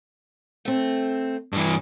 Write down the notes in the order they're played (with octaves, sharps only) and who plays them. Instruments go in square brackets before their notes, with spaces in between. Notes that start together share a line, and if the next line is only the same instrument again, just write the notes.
[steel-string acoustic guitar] A3 C4
[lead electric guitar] G2 E3